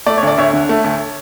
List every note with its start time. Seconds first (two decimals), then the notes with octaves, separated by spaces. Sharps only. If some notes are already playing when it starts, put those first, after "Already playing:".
0.06 A3 D5
0.17 C#5
0.22 D2
0.27 D5
0.38 D2 C#5 E5
0.53 D3
0.69 A3
0.84 D2